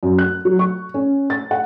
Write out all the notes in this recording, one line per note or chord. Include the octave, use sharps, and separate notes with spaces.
F#2
F#6
F#3
C#6
C#4
A6
F#5